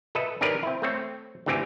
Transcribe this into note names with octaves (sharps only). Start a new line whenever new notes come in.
A4 B4 D#5 E5
D#3 C#4 D4 G4 A#4 B4
C4 E4
A3 C4 C#5
D2 G2 E3 C4 G4 G#5